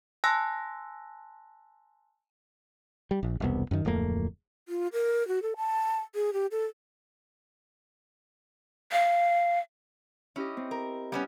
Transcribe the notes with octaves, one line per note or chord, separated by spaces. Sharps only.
G#5 A5 C6 E6 F#6 A#6
G3
A#1
E1 C2 B3
F#2 D#3
D1 F2 A3 A#3
F4
A#4
F#4
A4
A5
G#4
G4
A4
F5
C#4 E4 G4 D#5
C4
A#4
G3 B3 C#4